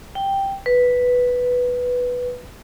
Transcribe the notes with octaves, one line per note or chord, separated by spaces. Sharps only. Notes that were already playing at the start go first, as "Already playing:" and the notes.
G5
B4